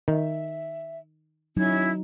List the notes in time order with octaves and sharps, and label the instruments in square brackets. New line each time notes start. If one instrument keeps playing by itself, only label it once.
[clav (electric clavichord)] D#3 [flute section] E5
[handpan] F#3 D#4 [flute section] C#4 E4 G#6